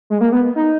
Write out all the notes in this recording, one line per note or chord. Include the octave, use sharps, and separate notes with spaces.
G#3
A#3
B3
D#4